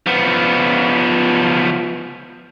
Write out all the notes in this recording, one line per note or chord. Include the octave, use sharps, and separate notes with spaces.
F3 B3